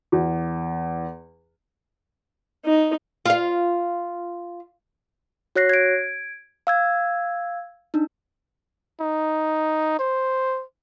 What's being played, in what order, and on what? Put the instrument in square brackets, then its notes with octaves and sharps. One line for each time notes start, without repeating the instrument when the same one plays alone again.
[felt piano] E2
[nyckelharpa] D#4
[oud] F4 F5
[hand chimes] F#4 C#5 F#6 A#6 C7
G#6 D7
F5 E6 G#6
D4 D#4
[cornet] D#4
C5